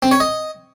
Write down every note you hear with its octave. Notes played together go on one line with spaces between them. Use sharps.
C4
C#5
D#5